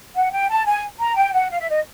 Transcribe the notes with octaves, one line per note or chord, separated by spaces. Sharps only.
F#5
G5
A5
G#5
A#5
G5
F#5
F5
E5
D#5